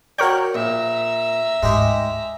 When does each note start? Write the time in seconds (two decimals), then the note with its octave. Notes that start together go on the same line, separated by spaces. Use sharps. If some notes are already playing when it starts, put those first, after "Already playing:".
0.18 F#4 A#4 C#5 D5 G5
0.55 A#1 E5 A#5
1.63 D2 G#2 G#3 G4